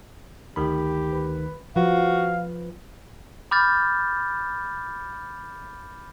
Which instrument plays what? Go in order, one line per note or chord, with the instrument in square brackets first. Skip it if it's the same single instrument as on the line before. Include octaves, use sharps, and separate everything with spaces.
[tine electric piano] D2 D#3 B5 [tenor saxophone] G4
[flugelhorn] B4
[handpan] F3 [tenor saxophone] F#4 [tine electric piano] B4 [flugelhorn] F5
[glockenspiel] B5 D6 F6 G6 A6